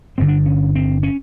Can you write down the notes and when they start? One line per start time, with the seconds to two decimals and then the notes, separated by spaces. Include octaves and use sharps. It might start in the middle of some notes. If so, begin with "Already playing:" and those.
0.18 G1 G2 D3 C4
0.28 D4
0.46 C#4
0.75 C4
1.03 C#4